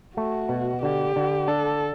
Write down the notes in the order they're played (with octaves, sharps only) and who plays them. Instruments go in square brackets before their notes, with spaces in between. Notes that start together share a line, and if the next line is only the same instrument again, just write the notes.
[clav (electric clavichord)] A3 [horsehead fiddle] F#4
[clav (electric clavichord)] B2
[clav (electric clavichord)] D3 [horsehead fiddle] G4
[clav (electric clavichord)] D3
[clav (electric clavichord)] D4 [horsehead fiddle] A4